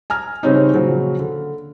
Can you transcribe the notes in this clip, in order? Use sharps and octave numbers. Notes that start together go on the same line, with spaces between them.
G#5 A#5 F6
C#3 G3 C4 C#4 D#4
A#2 C#3 F3 F#3
D3